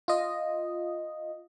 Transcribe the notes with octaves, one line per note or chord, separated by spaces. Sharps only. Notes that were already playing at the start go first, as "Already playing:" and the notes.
F4 D#5